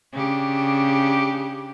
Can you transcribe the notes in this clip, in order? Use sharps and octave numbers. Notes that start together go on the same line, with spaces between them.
C#3 D4 G4